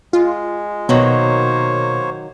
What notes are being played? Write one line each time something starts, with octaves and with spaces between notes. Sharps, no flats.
G#3 F4
B2 D#3 F#3 A#3 C5 C#5